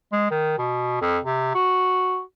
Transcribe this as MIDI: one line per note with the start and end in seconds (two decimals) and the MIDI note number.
0.12 0.28 56
0.31 0.56 51
0.59 0.99 47
1.01 1.18 41
1.25 1.54 48
1.55 2.21 66